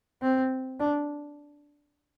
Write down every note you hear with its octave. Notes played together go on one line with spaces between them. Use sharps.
C4
D4